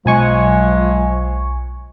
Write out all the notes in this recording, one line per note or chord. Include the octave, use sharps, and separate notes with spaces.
B1 F3 F#3 G#3 G#5 C#6